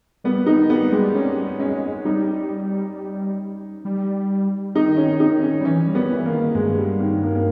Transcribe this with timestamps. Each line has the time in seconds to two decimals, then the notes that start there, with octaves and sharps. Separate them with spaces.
0.24 G3 B3
0.46 D#3 D#4
0.70 G3 B3
0.92 G3 G#3
1.15 G3 C#4
1.60 G#3 C#4
2.05 G3 D#4
3.85 G3
4.75 D#3 D#4
4.97 C#4
5.20 D#4
5.43 C#4
5.60 G3
5.65 E3 C#4
5.87 G3
5.95 B3
6.10 E3
6.26 A#3
6.32 D#3
6.55 G2 G#3
6.78 G3
7.00 D#3
7.23 A#3
7.35 A#3